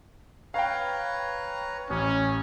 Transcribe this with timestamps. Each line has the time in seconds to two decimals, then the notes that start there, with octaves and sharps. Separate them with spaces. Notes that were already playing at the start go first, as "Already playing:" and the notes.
0.54 B4 C#5 F5 G5 A#5
1.90 A1 C#4